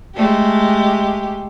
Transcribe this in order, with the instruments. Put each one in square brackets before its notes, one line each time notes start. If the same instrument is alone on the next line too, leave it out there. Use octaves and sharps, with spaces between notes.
[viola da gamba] G#3 A3 G4